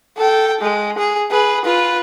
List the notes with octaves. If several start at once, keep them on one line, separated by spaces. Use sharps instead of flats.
A4 G5
G#3
G#4
G#4 B4
F4 B4